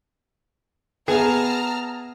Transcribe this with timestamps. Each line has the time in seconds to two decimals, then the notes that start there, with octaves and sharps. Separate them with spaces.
1.08 B3 G#4 E5 A5 A#5 F6